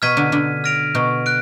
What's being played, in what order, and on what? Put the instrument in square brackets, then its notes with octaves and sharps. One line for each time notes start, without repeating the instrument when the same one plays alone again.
[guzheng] B2 [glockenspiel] F6 G#6 B6 D#7
[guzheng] D3
D3
[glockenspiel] F6 A#6 D7 F7
[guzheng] B2
[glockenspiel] F#6 D7